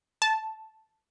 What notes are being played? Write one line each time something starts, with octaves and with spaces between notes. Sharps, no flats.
A5